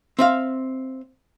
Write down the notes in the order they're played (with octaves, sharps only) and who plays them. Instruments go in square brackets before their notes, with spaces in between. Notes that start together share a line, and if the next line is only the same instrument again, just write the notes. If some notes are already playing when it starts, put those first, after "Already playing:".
[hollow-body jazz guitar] C4 E5 F5